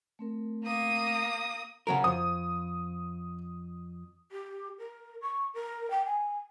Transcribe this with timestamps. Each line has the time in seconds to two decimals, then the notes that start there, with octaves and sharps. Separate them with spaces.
0.19 A3 C4 A#4
0.64 A#3 D#6
1.87 C#3 F#3 A#4
2.04 F2 D#6
4.32 G4
4.79 A#4
5.22 C#6
5.54 A#4
5.91 G5
6.06 G#5